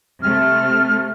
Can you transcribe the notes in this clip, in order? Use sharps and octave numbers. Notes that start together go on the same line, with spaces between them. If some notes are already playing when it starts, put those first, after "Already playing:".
C3 A3 F6